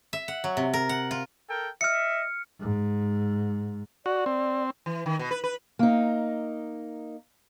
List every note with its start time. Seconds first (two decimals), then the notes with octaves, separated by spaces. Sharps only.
0.13 E5
0.28 F#5
0.44 F#3
0.57 C3
0.74 A#4
0.89 F#5
1.11 F4
1.49 A4 A#4 G5
1.81 D#5 E5 F6 C#7
2.60 G#2
4.06 F#4 D5
4.26 C4
4.86 E3
5.06 D#3
5.19 B2
5.31 B4
5.44 B4
5.79 A#3 D#4